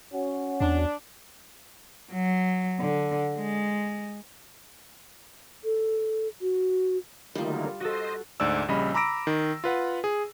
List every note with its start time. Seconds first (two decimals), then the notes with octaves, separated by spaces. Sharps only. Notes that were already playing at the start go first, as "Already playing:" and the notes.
0.13 C#4 F#4
0.61 E2 D4
2.12 F#3
2.80 D3
3.37 G#3
5.64 A4
6.41 F#4
7.35 D3 D#3 F#3 G3 A3 A#3 D#4 F4
7.80 F#4 A4 C5 D#5
8.40 D2 G#2 D5 E6
8.68 A#1 C#3 G3 D#5 B5
8.94 A#5 B5 D6 E6 A#6 D7
9.27 D#3
9.64 F4 B4 F#5
10.04 G#4